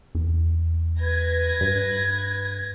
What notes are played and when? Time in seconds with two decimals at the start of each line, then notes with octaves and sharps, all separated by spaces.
0.15 E2
1.01 B4 G#6 A#6
1.61 G2